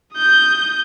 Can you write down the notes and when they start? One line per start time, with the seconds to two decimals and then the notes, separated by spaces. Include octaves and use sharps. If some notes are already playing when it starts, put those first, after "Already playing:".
0.14 D#6 G6